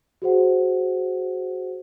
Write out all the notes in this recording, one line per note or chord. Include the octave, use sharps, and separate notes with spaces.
F#4 G#4 C5 F#5